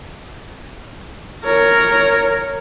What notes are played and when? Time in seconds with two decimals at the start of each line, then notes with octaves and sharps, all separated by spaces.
1.45 A#4 C#5